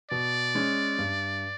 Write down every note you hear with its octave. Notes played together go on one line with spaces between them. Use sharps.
B2 D5
G#3 C#4
G2